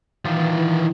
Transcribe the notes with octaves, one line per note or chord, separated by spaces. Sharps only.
D#3 E3 F4